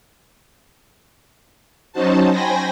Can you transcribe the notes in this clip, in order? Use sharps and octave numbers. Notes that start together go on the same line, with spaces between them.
F#3 C#4 D#4 F#4 C5 A5
C5 G5 G#5 B5 A#6